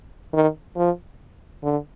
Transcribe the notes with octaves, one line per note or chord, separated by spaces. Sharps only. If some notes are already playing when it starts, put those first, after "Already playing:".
D#3
F3
D3